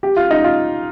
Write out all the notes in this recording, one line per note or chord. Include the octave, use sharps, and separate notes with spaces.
G4
F4
D#4
F4